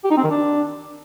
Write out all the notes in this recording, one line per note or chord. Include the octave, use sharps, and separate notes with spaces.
G4
D#4
C4
D#3
D4